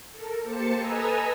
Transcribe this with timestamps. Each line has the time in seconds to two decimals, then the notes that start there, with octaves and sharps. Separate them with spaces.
0.12 A4 A#4
0.43 A#3 G4 C5 A5 C#7
0.77 A4 B4 D#5 G#5 A#5 E6